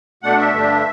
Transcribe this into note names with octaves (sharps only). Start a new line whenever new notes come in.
B2 A3 D4 F#5
E5
G2 D3 A3 D4